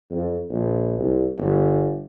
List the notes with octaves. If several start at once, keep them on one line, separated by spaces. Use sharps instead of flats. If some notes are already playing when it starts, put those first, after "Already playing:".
F2
A#1
C2
G1